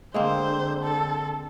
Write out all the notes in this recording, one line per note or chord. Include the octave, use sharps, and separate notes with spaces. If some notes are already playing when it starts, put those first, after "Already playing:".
D3 G#3 A#3 C4 C5
A4